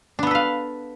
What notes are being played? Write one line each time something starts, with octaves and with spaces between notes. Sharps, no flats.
B3 D4 A4 B4 F5